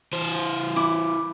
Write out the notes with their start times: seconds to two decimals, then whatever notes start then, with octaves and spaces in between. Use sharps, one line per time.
0.13 E3 C5
0.76 E4 D6